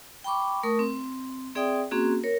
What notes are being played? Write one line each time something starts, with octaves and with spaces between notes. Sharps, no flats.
G5 B5 C#6 D6
A3 A#4 C#6 D#6
C4
C4 G#4 D5 E5 G5 D#6
A#3 C4 C#4 F#4 G#4
A#4 C#5